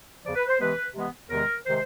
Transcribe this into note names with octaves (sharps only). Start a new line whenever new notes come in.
E2 C#3 F3 D5
B4
C5
C3 E3 G#3 B3 B4
C3 E3 G#3 B3
E2 C3 D#3 G#3 A#4
C3 D#3 G#3 C5